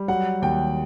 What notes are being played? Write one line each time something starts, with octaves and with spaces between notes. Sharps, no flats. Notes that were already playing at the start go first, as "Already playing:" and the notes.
Already playing: G3
F#3 F#5
D#2 G5